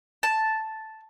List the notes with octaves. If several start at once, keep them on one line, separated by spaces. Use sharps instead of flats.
A5